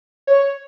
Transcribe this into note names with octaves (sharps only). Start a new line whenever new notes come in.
C#5